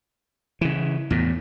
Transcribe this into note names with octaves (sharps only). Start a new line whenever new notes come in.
C#3 E3
E2 A2